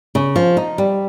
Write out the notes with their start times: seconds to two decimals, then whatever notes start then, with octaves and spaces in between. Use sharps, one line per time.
0.15 C#3
0.36 F3
0.57 D#4
0.78 G3